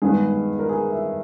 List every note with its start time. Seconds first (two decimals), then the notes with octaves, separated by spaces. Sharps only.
0.02 G2 D#3 G#3 B3 G#4
0.59 A#4
0.69 G#4
0.92 E5